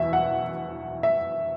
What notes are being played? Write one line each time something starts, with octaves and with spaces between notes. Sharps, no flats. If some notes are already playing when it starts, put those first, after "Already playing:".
Already playing: E2 B2 E5
F#5
E5